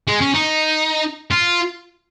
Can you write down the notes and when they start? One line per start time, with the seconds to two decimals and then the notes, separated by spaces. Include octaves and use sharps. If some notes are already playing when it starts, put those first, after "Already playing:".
0.08 G#3
0.21 C#4
0.34 D#4
1.31 F4